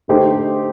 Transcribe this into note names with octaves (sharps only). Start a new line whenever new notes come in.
D3 A3 D#4 G4 C5